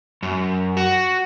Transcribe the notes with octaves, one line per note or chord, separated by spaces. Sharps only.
F#2
F#4